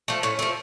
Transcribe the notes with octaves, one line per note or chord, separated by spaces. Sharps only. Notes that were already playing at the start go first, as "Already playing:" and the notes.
F3 A3
A2 C#4
F3 A3